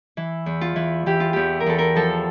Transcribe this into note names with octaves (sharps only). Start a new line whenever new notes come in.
E3
E2
F4
E3
E3 G4
F4
E2 G4
A#4
E2 A4
A#4
F3 A4